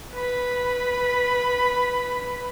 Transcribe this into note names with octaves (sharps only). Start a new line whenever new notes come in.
B4 B5